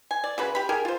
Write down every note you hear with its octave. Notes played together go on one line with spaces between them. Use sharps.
G#5
D5
C#3 F#4 B4
G4 B5
G4 G#4 A#4
F4 C5